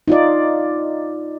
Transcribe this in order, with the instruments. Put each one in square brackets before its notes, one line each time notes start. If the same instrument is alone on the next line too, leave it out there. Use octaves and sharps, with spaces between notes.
[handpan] D#4 F4 D5